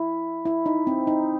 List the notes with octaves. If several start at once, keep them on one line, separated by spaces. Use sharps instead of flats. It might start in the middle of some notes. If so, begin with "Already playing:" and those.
Already playing: E4
E4
D#4
C4
D#4